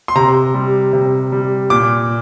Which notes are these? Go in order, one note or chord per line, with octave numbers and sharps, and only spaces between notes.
C6
C3 A#5
G3
C3
G3
A#2 D6